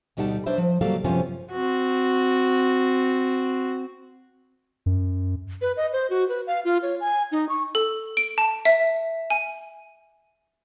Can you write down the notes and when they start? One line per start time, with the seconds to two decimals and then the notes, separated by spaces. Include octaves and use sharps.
0.17 D2 B2 G3 D#4 F#5 A5
0.46 F#3 D4 B4 C5 E5
0.58 F3
0.81 C#3 F#3 G3 A#3 A4 F5
1.04 F#2 C3 F3 B3 C#4 G#5
1.52 C4 F#4
4.86 F#2
5.61 B4
5.77 D#5
5.93 C5
6.10 F#4
6.29 B4
6.47 F5
6.65 F4
6.83 C#5
7.00 G#5
7.32 D#4
7.49 C#6
7.75 A4
8.17 D7
8.38 A5
8.65 E5
9.30 G#5